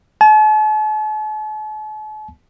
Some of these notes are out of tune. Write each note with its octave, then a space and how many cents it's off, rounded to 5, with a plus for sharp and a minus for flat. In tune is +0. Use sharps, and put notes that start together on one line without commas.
A5 -45